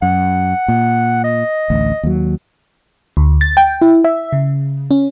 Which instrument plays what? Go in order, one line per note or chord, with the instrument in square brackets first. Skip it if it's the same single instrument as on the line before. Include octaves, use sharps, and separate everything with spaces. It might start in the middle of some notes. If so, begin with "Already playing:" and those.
[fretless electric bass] F#2 [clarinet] F#5
[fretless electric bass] A#2
[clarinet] D#5
[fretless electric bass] A1 D2
D#2 F#3
[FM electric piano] D2
A6
G5
E4
E5
C#3
C#4